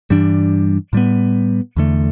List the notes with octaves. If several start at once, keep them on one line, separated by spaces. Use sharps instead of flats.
G2 E3 G3 D4
A2 G3 B3
E2 D3 A3